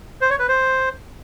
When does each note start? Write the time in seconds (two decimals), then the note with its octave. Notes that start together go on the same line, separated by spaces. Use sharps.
0.21 C5
0.30 C#5
0.39 B4
0.48 C5